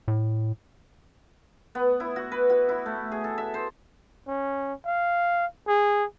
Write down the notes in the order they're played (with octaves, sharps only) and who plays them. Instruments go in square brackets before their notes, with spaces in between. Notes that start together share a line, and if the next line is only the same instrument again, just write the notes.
[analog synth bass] A2
[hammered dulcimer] B3
E4
F#4
B4
F#4
E4
A3
G#4
A4
E5
C5
[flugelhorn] C#4
F5
G#4